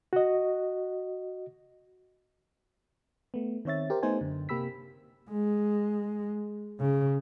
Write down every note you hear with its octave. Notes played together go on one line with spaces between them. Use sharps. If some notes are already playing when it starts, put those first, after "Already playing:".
F#4 D#5
A3 B3
D#3 C4 C#5 E5 A6
G4 A#4 C5
A3 B3 D#4 C5 G#5
F#2 D3
C3 A#3 G4 B5 E6 B6
G#3
C#3